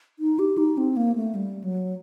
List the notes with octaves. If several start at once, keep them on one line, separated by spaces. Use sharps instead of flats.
D#4
G4
D#4
C4
A#3
A3
G3
F#3